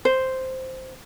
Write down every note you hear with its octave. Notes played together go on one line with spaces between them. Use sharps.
C5